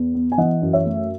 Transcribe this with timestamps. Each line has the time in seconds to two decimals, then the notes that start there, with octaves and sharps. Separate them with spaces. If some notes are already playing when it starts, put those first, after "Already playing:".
Already playing: E2
0.14 B3
0.32 G#5
0.38 E3 D#5 F#5
0.62 F#2
0.73 C#5 E5
0.85 A3